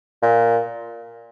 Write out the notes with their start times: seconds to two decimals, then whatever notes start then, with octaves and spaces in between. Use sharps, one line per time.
0.22 A#2